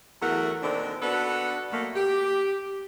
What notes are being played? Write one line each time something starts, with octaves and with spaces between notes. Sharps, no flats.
E2 F#3 A3 F#4 A4 A#4
A#2 D3 D#3 C4 D4
B3 D4 F#4 A4 B4
B2 F#3 A3 A#3
G4